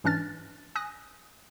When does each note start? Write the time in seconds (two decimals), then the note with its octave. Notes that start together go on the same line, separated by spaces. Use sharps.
0.04 G#2 E3 C#4 D4 F6 A6
0.75 G#5 D#6 F#6 A#6